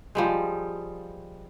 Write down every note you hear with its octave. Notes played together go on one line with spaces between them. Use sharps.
F3 G3 G#3